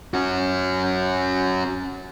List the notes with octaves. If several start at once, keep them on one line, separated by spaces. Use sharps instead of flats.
C#4 F#4